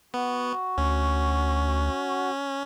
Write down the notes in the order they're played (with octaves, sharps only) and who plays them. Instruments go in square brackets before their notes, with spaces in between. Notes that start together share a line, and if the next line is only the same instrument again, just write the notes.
[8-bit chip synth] B3 [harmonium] F#4
[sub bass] D2 [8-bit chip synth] C#4